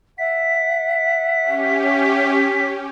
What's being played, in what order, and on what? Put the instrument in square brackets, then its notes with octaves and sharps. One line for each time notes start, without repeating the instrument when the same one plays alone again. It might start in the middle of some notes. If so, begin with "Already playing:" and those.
[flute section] E5 F#5 [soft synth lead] B6
[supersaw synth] C#4 G4